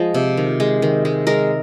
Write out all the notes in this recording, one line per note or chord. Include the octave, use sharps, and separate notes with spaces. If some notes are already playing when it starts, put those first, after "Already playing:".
Already playing: F3 G#3 D#5
C3
D#3
G#3
D#3
G#3
G#3 A#4